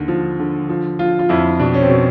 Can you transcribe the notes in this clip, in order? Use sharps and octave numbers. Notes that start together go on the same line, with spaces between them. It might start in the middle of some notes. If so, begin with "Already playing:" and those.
Already playing: D#2 D3
F3
D3
F3
F3 F4
F4
F2 E4
B2 D4
C#4
C4
B2